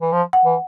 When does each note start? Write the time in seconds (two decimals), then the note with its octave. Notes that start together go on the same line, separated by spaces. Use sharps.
0.01 E3
0.12 F3
0.33 F#5
0.45 E3